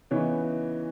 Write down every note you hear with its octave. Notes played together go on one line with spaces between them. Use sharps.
C#3 E3 B3 D#4 C#5